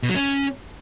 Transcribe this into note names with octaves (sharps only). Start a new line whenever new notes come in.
B2
F#3
C#4